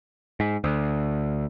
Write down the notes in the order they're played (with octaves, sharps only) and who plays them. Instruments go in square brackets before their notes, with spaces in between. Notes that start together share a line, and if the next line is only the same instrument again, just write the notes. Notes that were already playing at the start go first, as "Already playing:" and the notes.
[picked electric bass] G#2
D2